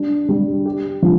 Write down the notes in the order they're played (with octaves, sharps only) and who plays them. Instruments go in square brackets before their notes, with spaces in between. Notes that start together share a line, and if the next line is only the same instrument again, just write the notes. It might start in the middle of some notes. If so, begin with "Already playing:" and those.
Already playing: [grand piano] G3 D4
G3
G4
F3